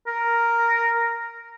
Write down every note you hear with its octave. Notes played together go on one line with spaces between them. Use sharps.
A#4